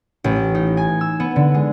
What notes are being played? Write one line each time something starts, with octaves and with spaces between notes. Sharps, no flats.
A1
D#4
G#5
E6
B3
D3
G#3